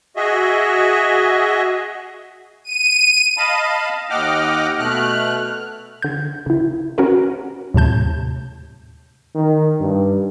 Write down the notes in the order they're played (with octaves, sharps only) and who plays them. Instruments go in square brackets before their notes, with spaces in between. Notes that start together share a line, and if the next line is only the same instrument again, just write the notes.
[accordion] F#4 G#4 D#5 E5
[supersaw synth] D#7
[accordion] D#5 F5 A5 B5
D#2 D#5 F#5 G5 D6 F6
B2 A3 F6 F#6
[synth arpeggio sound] D3 G6
C#3 E4
C#4 F#4 A#4 B4
D#2 A2 C3 A5 G6
[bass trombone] D#3
G2